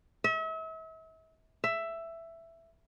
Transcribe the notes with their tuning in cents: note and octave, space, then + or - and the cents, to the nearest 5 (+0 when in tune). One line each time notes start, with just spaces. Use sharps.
E5 -40
E5 +10